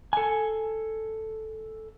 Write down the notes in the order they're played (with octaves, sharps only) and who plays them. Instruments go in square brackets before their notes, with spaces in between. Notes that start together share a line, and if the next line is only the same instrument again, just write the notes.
[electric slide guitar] A4 G#5